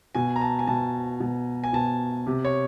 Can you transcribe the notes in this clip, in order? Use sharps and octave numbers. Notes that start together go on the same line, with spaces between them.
B2 G#5
A#5
A5
G#5
B2 A5
B2
G#5
B2 A5
C3
C#5